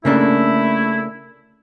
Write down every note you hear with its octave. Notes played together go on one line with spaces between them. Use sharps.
C#3 A3 A#3 D4 E4